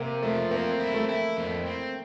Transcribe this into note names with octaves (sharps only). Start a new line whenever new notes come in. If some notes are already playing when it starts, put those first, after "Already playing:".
Already playing: C3 A#3 C4
F3 A3
A#3 C4
E4
A3
E4
F2
C4